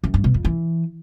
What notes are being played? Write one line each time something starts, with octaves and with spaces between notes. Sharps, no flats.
F#2
G2
B2
F2
E3